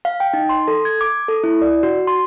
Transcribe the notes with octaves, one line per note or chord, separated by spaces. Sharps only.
F5
G5
D#4
C6
A4
G#6
D6
A4
E4
D5
F#4
C6